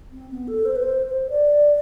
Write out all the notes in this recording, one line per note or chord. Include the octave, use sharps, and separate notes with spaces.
C4
B3
A4
C5
B4
C5
C5
D5